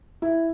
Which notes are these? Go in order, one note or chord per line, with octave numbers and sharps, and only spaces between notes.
E4